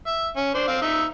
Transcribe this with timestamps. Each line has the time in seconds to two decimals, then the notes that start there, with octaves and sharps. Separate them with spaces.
0.07 E5
0.37 C#4
0.55 D4 C5
0.68 C4 F5
0.82 D#4 E5